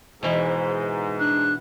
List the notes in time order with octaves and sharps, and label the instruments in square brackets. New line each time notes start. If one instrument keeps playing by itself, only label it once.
[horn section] G#2 [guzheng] B2 E3 [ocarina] C5
[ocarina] D4 [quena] F#6